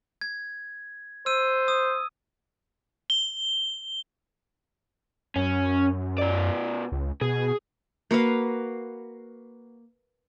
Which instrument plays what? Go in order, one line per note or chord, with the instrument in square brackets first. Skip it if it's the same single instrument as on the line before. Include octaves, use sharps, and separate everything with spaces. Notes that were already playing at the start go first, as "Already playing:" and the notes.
[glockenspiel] G#6
[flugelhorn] C5 [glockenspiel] E6 D#7
[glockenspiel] D#6
[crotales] G7
[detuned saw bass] F#2 [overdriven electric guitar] C#4
[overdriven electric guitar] B2 D5
[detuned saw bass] C#2
[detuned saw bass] B2 [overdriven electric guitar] G#4
[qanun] A#3 F#4 B4 F5